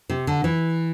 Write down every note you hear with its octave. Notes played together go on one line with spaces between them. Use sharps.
C3
D3
E3